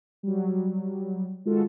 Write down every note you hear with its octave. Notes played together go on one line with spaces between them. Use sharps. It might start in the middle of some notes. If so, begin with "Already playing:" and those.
F#3 G3
D#3 G#3 F4 F#4 A4